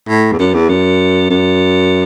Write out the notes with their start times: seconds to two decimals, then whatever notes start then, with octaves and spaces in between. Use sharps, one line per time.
0.09 A2
0.32 E2
0.39 F#2
0.54 E2
0.69 F#2
1.30 F#2